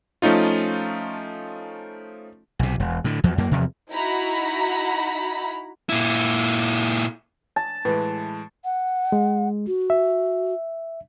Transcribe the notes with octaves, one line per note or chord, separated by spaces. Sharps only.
F3 A3 C#4 D#4 F4
B1 C3
E1
A2 D3
E2 F3 F#3
F#2 A#3
E2 C3 F3
D#4 E4 F#4 A#5 B5
A#2 E4
A5
A2 E3 G#3 B4
F#5
G#3
F#4
E5